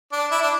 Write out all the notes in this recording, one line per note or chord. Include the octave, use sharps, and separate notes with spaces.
D4
E4
D4